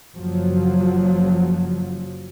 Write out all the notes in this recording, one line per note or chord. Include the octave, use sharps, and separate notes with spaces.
F#1 F3 F#3